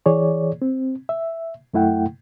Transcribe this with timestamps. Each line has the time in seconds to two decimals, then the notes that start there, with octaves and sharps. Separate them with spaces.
0.06 E3 G#4 C#5 D5
0.62 C4
1.09 E5
1.74 F#2 A3 E4 F#5 G5